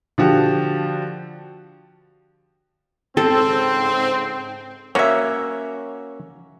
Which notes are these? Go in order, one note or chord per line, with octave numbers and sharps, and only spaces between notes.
D3 F3 F#4 G4
G#2 C#3 C4 A4
A#3 C#4 F#4 C#5 E5